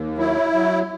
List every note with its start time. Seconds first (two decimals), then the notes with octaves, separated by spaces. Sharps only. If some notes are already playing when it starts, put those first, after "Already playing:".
Already playing: D#2
0.18 F#3 E4
0.52 F#3